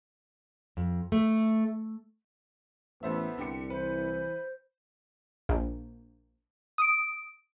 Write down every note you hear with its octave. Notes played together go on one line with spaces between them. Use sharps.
F2
A3
A1 B3 A4 C5 E5
C2 D3 G4 C#7
E3 B4 C5
A#1
D#6 D7